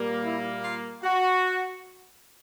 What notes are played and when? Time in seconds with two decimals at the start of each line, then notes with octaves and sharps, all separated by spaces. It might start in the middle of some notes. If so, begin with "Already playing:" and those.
Already playing: A#2 G3 A#3
0.24 E4
0.64 F4
1.03 F#4